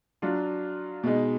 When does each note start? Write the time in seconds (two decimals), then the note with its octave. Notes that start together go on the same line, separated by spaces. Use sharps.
0.22 F#3 D4 F4
1.03 B2 G#3 D#4